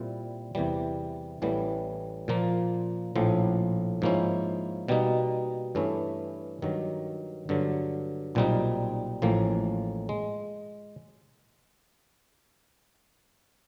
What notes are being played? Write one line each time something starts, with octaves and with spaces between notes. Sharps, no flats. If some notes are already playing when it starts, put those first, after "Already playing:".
Already playing: A#2 G3 C4 E4
E2 C3 E3 G3
A1 A2 E3 G3 B3
A#2 F3 A#3
A#1 A2 F3
G#2 F3 A#3 C#4 E4
B2 G3 A#3 D#4
G2 E3 A3 C#4 E4
G2 D#3 F#3
G2 D3 F#3
B1 A#2 G3 C4 D#4
A1 A2 F3 A#3
G#3